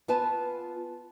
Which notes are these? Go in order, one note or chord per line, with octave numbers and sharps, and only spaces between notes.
B3 F4 B4 G#5 A5